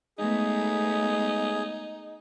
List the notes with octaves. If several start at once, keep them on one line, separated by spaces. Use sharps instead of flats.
G#3 A3 B3 D#4 G#4